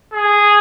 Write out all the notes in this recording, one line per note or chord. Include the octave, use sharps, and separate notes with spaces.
G#4